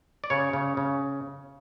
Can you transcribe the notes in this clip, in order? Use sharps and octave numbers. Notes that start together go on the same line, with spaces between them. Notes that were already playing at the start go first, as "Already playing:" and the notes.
D5
C#3 C#5
C#3
C#3